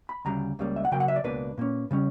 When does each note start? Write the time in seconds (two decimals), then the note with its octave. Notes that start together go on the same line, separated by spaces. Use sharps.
0.09 B5
0.25 D2 C#3 G3 A#5
0.59 C#2 C#3 G3 A#3
0.76 E5
0.85 F#5
0.91 C#3 F#3 A#3 G5
1.00 F#5
1.08 E5
1.16 D5
1.24 C#2 B2 A#3 D4 B4
1.58 A#2 A#3 C#4
1.91 C#3 G3 C#4